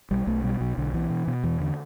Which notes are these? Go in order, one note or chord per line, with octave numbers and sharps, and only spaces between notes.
B1 G3
B1 A3
B2 G3
B1 F#3
B1 D3
B2 E3
B2
B2
E2 E3
D3